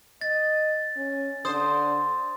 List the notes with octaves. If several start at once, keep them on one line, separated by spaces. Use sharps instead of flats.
D#5 A6
C#4
D3 C5 D#6